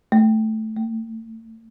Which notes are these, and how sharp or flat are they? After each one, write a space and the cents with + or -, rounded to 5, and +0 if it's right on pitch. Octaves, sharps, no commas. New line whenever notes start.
A3 -5
A3 +40